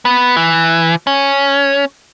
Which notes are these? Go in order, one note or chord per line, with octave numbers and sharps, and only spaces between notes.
B3
E3
C#4